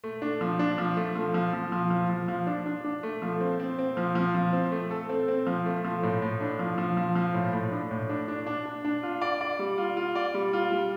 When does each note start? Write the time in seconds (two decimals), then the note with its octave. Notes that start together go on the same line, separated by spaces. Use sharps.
0.04 A3
0.22 D4
0.41 F3
0.59 D4
0.78 F3
0.97 A3
1.15 F3
1.34 F3
1.53 F3
1.72 F3
1.90 F3
2.10 F3
2.28 F3
2.47 D4
2.66 D4
2.84 D4
3.03 A3
3.22 F3
3.41 C4
3.59 C4
3.79 C4
3.97 F3
4.15 F3
4.35 F3
4.53 C4
4.72 A3
4.91 A4
5.09 C4
5.28 C4
5.47 F3
5.66 A3
5.85 F3
6.03 A2
6.22 A2
6.41 D4
6.59 F3
6.78 F3
6.97 F3
7.15 F3
7.34 A2
7.53 A2
7.72 D4
7.91 A2
8.09 D4
8.28 D4
8.46 D4
8.66 D4
8.84 D4
9.03 F4
9.22 D5
9.41 D5
9.59 G3
9.78 F4
9.97 F4
10.15 D5
10.34 G3
10.53 F4
10.72 G3